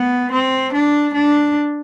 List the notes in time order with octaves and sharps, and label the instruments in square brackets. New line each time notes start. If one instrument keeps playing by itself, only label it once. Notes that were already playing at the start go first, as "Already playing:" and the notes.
Already playing: [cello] B3
C4
D4
D4